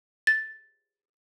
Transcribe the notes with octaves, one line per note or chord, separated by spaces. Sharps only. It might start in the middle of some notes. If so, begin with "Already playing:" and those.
A6